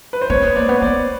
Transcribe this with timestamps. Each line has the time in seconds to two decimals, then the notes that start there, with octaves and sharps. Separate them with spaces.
0.13 B4
0.21 C5
0.30 C4 B4 C#5
0.42 B3
0.56 A#3 C5 D5
0.69 B3 C#5
0.82 B3 C5 D5